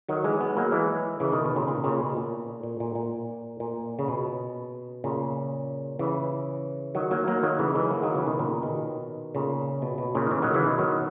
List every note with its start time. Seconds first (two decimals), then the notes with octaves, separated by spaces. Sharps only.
0.09 D#3 F#3
0.24 E3 G#3
0.40 G#3 B3
0.57 F#3 A#3
0.72 E3 G#3
1.20 C#3 E3
1.32 B2 D#3
1.45 B2
1.56 A#2 C#3
1.68 A#2 C#3
1.84 A#2 C#3
2.00 B2
2.17 A#2
2.63 A#2
2.80 A#2
2.95 A#2
3.60 A#2
3.99 C#3
4.08 B2
5.04 A#2 C#3
5.99 C#3 E3
6.95 D#3 F#3
7.11 F#3 A#3
7.27 F#3 A#3
7.43 D#3 F#3
7.59 C#3 E3
7.75 E3 G#3
7.91 F#3 A#3
8.02 D#3 F#3
8.15 C#3 E3
8.26 B2 D#3
8.39 A#2 C#3
8.63 B2 D#3
9.35 A#2 C#3
9.82 B2
9.98 B2
10.15 A#2 C#3
10.26 D#3
10.31 C#3 E3
10.42 D#3 F#3
10.54 C#3 E3
10.66 B2 D#3
10.79 D#3 F#3